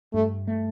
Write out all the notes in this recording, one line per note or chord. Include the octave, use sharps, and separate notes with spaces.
G2 A3
A3